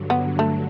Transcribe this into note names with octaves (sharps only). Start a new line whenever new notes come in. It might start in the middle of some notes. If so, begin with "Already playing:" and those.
Already playing: G2 D3 F#3
B3
A3